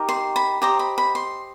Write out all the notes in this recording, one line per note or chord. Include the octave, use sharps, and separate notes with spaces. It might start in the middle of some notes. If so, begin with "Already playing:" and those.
Already playing: D#4 G4 A#4
C6
B5
G4 C5 D#5 A#5
B5
B5
C6